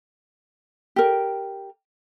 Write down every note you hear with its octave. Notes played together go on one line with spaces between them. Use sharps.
G4 A#4